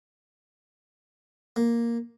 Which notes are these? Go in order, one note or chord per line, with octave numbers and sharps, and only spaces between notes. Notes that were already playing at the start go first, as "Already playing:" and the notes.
A#3